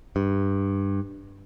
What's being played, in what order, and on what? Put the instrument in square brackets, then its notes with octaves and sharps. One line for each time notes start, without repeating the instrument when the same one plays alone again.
[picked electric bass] G2